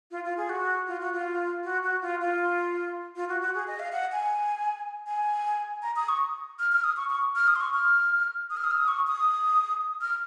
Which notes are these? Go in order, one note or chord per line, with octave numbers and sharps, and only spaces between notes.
F4
F4
G#4
F#4
F4
F#4
F4
F#4
F#4
F4
F4
F4
F#4
F#4
G#4
D#5
F5
F#5
G#5
G#5
A#5
D#6
C#6
F6
F6
D#6
C#6
C#6
F6
D#6
C6
C#6
F6
D#6
F6
D#6
F6
D#6
C#6
D#6
F6